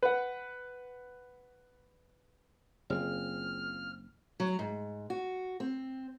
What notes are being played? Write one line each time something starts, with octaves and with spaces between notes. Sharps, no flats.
B4 F#5
F#1 C4 F4 G#4 F6
F#3
G#2
F#4
C4